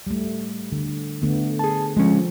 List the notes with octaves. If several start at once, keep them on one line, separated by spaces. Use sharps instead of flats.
G3 A3
D3
D3 A3 B3
G#4 A5
F3 G#3 C#4